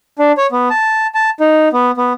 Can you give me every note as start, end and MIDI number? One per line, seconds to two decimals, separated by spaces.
0.19 0.32 62
0.37 0.47 73
0.52 0.69 59
0.70 1.07 81
1.15 1.30 81
1.40 1.68 63
1.73 1.91 59
1.97 2.13 59